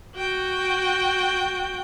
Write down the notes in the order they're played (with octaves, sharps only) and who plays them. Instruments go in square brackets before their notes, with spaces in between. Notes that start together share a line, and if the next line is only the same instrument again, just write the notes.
[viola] F#4 G5